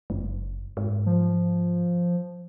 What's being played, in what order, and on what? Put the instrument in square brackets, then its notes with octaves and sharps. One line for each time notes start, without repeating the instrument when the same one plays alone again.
[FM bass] F#1
G#2
[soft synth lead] F3